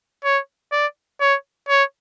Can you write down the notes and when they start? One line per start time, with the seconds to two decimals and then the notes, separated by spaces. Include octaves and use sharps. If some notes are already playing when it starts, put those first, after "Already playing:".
0.25 C#5
0.72 D5
1.21 C#5
1.69 C#5